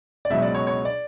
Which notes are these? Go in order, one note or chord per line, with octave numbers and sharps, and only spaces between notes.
D5
C#2 B2 F#3 E5
D5
C#5
C#5
D5